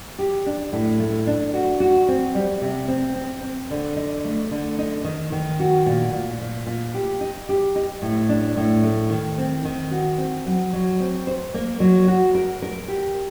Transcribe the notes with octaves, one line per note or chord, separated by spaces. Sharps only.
G4
D4
A2
A3
D4
F#4
F#4
C4
G3
C3
C4
C4
C4
D3
D#4
A3
D3
D#4
D#3
D#3
F#4
A#2
A#2
A#2
A#2
G4
D#4
G4
D#4
A2
D4
A2
A3
D#3
C4
D#3
F#4
C4
F#3
F#3
C4
C5
A#3
F#3
F#4
A#4
A#4
G4